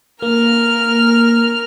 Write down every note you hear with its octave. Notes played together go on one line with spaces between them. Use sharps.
A#3 A#4 F6